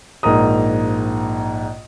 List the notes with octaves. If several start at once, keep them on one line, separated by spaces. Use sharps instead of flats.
A#1 G#2 A#4 A#5 D#6